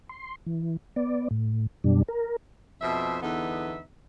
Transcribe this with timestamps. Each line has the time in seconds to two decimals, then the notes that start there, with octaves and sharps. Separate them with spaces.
0.09 C6
0.46 E3
0.96 B3 D5
1.31 A2
1.84 F#2 B2 G3 D4
2.08 A#4
2.81 F2 B2 C5 E5
3.21 E2 D3 B3 D#4 E5